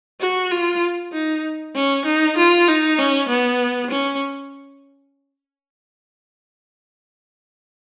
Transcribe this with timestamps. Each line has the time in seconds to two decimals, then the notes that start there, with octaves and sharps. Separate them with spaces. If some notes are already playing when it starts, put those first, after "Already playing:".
0.20 F#4
0.51 F4
1.13 D#4
1.75 C#4
2.05 D#4
2.37 F4
2.68 D#4
2.99 C#4
3.29 B3
3.91 C#4